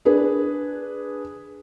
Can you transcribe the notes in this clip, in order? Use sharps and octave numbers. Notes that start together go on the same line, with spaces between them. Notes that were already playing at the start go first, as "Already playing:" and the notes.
D4 G#4 B4